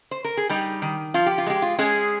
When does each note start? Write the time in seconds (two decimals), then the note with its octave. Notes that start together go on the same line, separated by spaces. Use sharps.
0.11 C5
0.25 A#4
0.37 G#4
0.49 G3 D#4 G4
0.82 D#3
1.14 F3 F4
1.26 G4
1.38 F4
1.47 G#3 G4
1.62 F4
1.79 G#3 C#4 G#4